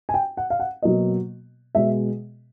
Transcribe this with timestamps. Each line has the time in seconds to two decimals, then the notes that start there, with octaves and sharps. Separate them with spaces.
0.09 G#5
0.14 G5
0.37 F#5
0.50 F5
0.60 F#5
0.82 B2 F#3 A#3 D#5
1.75 B2 G#3 E5